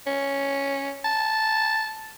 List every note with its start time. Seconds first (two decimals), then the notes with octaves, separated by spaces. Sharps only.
0.07 C#4
1.05 A5